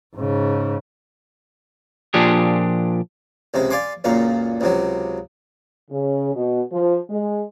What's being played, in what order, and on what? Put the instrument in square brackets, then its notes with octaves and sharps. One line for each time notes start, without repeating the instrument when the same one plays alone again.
[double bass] G#2 C#3
[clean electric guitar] A#2 F3 D4 G4 G#4
[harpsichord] C#2 C3 G#3
D5 F5 G#5 C6 D6
C#2 F#2 A#2 F5
C#2 C3 F#3
[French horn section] C#3
B2
F3
G#3